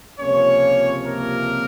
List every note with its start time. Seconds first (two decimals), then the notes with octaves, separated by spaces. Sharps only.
0.20 C#2 C3 F3 A#3 C#4 C#5
1.05 A#3 A#4